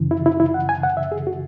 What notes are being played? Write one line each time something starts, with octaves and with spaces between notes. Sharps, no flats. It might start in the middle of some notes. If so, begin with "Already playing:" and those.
Already playing: F#2 C#3 E3
E4
E4
E4
F#5
G#5
F#5
E5
G#4
F#4